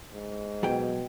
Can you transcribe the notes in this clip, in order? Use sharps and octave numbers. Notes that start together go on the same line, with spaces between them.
G#2
B2 F#3 G#4 G5